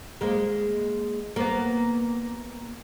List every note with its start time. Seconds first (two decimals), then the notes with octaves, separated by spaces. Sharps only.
0.21 G#3 A#3
1.36 A#3 B3